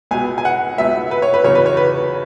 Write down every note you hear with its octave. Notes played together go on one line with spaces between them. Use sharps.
C#2 B2 B3 G#5
G#5
F#5
C#2 B2 B3 E5
B4
C#5
B4
E2 C#3 F#3 C#5
B4
C#5
B4